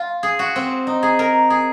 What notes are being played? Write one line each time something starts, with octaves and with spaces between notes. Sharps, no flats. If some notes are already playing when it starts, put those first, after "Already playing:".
Already playing: F4
G#4
F#4
C4
D#4
G#4
A#4
G#4